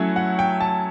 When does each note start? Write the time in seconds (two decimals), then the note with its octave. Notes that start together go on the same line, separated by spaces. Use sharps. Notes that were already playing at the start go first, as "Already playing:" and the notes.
Already playing: F#3 A3 C#4 E4
0.16 F#5
0.39 G5
0.61 A5